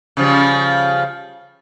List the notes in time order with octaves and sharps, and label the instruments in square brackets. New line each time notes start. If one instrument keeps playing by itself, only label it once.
[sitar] C#3 F3 G3